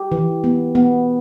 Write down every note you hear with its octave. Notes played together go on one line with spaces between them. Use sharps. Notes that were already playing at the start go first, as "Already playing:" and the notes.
Already playing: G4
E3
B3
B3